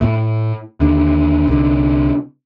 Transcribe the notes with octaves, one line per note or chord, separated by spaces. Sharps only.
A2 A3
D#2 D3
C2 D3